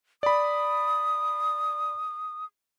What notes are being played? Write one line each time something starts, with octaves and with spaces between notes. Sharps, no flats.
D5 B5 D#6